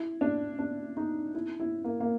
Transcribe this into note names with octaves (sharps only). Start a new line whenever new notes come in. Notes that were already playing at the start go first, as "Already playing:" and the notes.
Already playing: E4
D4
D4
D#4
E4
E4
A#3
A#3